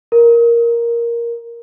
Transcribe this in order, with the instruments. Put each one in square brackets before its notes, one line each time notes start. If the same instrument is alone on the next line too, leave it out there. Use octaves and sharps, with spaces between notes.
[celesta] A#4